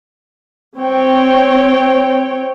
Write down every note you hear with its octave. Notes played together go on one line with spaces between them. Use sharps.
C4 C#5 G5